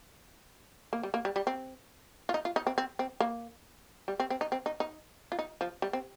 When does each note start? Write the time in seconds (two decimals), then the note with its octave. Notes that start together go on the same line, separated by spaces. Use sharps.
0.93 A#3
1.03 G3
1.14 A#3
1.25 G3
1.36 G3
1.47 C4
2.29 F4
2.34 D#4
2.45 F4
2.56 D#4
2.67 C4
2.78 C4
2.99 C4
3.20 A#3
4.08 G3
4.20 C4
4.30 C4
4.41 D#4
4.52 C4
4.66 D#4
4.80 D#4
5.32 F4
5.39 D#4
5.61 F3
5.82 G3
5.93 C4